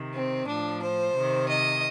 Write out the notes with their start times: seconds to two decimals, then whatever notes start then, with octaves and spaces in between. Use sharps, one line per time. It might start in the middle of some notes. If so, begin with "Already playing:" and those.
Already playing: C3 D#3
0.14 C4
0.47 A2 F3 D4
0.81 C5
1.14 C3 D#3
1.48 D#5